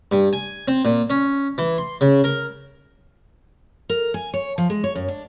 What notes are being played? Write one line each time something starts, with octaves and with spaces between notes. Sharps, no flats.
G2
G#5
C4
A#2
C#4
E3
C6
C#3
A#4
A#4
G#5
C#5
F3
G#3
C#5
F#2
D4